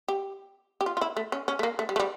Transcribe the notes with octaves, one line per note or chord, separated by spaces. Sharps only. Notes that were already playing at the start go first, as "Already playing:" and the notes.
G4
G4
F4
F4
E4
A3
C#4
C#4
A3
A#3
A3
G3
A3
G3